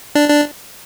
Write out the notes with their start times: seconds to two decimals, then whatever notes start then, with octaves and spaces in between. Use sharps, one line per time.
0.15 D4
0.29 D4